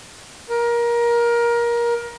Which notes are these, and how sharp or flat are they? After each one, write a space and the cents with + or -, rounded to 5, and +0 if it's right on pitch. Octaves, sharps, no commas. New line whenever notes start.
A#4 +20